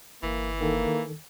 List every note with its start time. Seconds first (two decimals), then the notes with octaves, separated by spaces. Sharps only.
0.23 G1 E3 A#3
0.60 D#3 A#3 A4